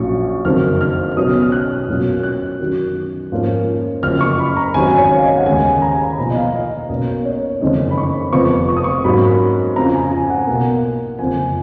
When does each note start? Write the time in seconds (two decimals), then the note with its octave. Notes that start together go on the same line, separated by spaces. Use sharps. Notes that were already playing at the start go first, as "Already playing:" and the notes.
Already playing: A#1 A#2 F#3 C#4 C#6
0.45 F#1 F2 D#3 F#3 F6
0.81 F6
1.12 F6
1.16 B1 B2 F#3 C#4 D#6
1.42 F6
1.52 F#6
1.88 B1 A#2 F#3 A#3 C#4
2.23 F#6
2.59 F#2 D#3 F#3
3.32 G#2 F3 A#3 C#4
4.02 F#1 F#2 F3 F6
4.21 C#6
4.39 B5
4.57 A#5
4.74 G#1 G#2 F#3 C#4 G#5
4.98 C#5
5.17 F5
5.23 D#5
5.38 F#5
5.46 D#2 C#3 G#3 G#5
5.82 A#5
6.11 B5
6.17 B1 A#2 F3 A#5
6.30 D#5
6.36 F5
6.54 D#5
6.89 B1 B2 A#3 C#4 D#5
7.25 C#5
7.61 F#1 F2 D#3 G#3 C#4 D#5
7.91 B5
7.98 C#6
8.32 F1 F2 F3 B3 C#6
8.69 C#6
8.77 D#6
8.84 C#6
9.04 G#2 F#3 A#3 C#4 B5
9.76 F2 C#3 F3 A#5
9.94 G#5
10.11 G#5
10.30 F#5
10.47 B1 B2 A#3
11.19 F#1 F2 F3 G#5